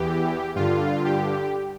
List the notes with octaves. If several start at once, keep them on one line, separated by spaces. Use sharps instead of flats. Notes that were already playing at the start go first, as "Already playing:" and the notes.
Already playing: E2 E3 G4
G2 D3 F4
G4